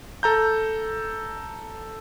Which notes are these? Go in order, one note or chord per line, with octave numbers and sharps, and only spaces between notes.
A4 A#5 G6